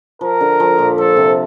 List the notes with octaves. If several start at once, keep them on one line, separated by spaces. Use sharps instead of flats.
F3 A#4
D3
F3
A#2
F3 A4
C3